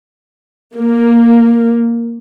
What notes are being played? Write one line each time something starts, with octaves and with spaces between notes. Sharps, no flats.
A#3